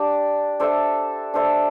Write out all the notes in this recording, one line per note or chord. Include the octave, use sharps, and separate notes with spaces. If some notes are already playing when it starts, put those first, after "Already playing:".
Already playing: D4 G4 D5
D4 A4 C5 E5
D4 A4 C5 E5